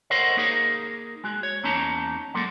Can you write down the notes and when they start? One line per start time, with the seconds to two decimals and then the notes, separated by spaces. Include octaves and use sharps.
0.10 A4 A#4 C5 C#5 D#5 F#5
0.37 A#3 D#4 G#4 A#4
1.24 G#3 F#4
1.43 C#5
1.63 E2 A#3 C#4 D#4 A5 A#5
2.34 F#3 G#3 A#3 A4